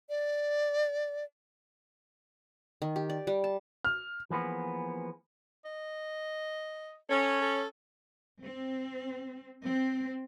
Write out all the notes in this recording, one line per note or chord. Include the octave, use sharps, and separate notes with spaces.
D5
D#3
G4
D5
G3
A5
F6
E3 F3 A#3 B3 G#4
D#5
C#4 A4
A4
C4
C4